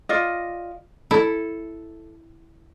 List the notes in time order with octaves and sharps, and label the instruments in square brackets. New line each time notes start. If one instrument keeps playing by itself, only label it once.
[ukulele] F4 D5 D#5
[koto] E4 [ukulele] A4